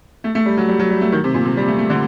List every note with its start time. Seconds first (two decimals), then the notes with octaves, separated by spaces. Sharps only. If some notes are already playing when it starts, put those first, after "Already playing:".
0.24 A3
0.35 A3
0.46 G3
0.57 F#3
0.68 G3
0.79 F#3
0.90 G3
1.01 A3
1.12 D#3
1.24 C3
1.34 A#2
1.45 C3
1.57 G3
1.68 A3
1.78 A3
1.90 D3